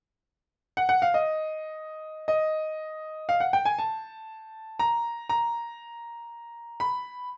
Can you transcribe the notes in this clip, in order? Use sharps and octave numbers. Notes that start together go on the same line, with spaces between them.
F#5
F#5
F5
D#5
D#5
F5
F#5
G5
G#5
A5
A#5
A#5
B5